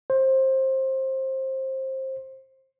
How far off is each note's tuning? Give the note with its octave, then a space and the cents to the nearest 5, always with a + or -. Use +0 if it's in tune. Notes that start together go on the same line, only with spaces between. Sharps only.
C5 +20